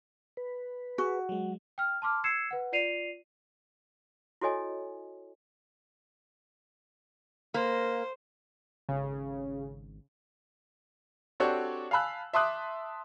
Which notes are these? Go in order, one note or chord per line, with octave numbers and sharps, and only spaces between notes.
B4
F#4 G#4
F#3 G#3
G5 F6
A5 C6 D6 F6
E6 G#6 C7 C#7 E7
B4 F#5
F4 D5 C7 D#7 F7
E4 F#4 A4 C#5 D#5 G#5
A#3 C5
G#1 C#3
C4 D4 F#4 G4 A4 C#5
F5 G#5 A5 B5 E6 F#6
E5 A5 C6 D6 D#6 F#6